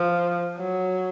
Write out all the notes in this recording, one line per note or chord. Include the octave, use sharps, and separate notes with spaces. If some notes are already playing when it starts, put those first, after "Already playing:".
Already playing: F3
F#3